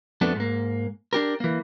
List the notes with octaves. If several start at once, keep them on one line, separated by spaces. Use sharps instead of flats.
F2 A3 B3 D4 A4
G#2 A#3
D4 G4 A#4
E3 A#3